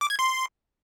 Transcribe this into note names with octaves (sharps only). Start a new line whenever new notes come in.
D6
G#6
C6